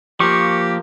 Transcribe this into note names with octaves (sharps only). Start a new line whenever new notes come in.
F3 A#3 G4 C#6